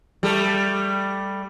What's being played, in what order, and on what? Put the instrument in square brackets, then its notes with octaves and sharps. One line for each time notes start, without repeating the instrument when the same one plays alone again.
[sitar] G3 A3 A4